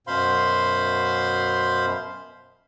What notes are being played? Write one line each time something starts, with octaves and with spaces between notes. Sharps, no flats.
F#2 B2 C5 F5 B5 C6